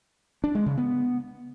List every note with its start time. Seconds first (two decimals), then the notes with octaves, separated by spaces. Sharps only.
0.44 D4
0.55 G#3
0.66 C#3
0.78 B3